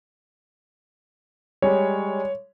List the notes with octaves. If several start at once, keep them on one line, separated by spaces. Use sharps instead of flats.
G3 G#3 C#5